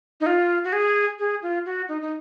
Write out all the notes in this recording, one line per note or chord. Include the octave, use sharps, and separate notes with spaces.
D#4
F4
F#4
G#4
G#4
F4
F#4
D#4
D#4